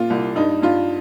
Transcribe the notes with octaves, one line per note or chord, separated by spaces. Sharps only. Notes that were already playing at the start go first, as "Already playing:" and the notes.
Already playing: A#2 F4
C2
G2 D#4
G2 F4